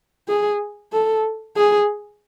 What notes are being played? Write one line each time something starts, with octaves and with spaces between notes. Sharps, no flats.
G#4
A4
G#4